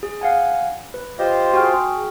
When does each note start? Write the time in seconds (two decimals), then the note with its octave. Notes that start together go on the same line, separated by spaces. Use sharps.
0.03 G#4
0.21 F5 F#5 G#5
0.94 B4
1.19 F4 G4 C5 D#5
1.54 F#4 G#4 G5 F6